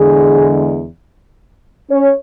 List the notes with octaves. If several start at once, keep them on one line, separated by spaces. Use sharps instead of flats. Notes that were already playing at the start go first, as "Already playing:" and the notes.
Already playing: E2 D3 G#3 G#4
C#4 C#5